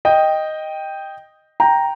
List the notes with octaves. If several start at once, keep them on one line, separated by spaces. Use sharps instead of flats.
D#5 G5
G5 A#5